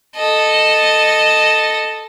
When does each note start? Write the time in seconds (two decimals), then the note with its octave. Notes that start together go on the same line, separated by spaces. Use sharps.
0.16 A4 D#5